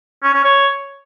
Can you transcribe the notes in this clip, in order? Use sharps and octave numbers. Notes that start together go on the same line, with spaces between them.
C#4
C#4
C#5